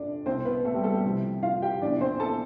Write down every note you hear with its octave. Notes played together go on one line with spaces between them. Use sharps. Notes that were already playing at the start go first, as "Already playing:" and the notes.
Already playing: F2 C3 D4 D5
C2 B2 C4 C5
B3 B4
A3 A4
G3 G4
A3 A4
G3 G4
C2 C3 F3
F4 F5
G4 G5
E2 C3 F3 D4 D5
C4 C5
A4 A5